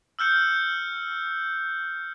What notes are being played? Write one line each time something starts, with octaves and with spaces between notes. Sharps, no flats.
E6 F6 G6 C#7